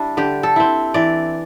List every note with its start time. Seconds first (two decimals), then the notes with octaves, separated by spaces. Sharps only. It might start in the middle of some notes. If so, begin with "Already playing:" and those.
Already playing: G3 D4 E4
0.17 D3 G4
0.43 A4
0.56 C4 E4
0.94 E3 D5